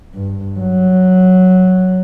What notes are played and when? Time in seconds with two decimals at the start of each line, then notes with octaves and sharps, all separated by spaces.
0.15 G2
0.60 F#3